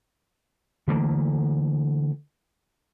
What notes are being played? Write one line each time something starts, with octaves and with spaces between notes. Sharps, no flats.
D3 E3 A3 A#3